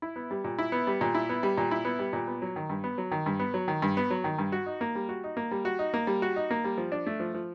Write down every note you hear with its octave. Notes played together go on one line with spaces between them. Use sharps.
E4
B3
G3
A#2
E4
B3
G3
A#2
E4
B3
G3
A#2
E4
B3
G3
A#2
B3
F#3
D#3
G2
B3
F#3
D#3
G2
B3
F#3
D#3
G2
B3
F#3
D#3
G2
F#4
D#4
A#3
G3
F#4
D#4
A#3
G3
F#4
D#4
A#3
G3
F#4
D#4
A#3
G3
F3
D4
A3
F3
F3